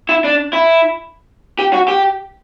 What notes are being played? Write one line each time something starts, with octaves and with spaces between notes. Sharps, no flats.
E4
D4
E4
G4
F#4
G4